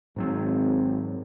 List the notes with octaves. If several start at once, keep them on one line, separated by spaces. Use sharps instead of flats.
G#1 G#2 F#3 C4